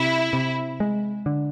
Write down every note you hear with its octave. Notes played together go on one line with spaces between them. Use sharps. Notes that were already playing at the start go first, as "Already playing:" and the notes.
Already playing: C3 E4
C3
G#3
D3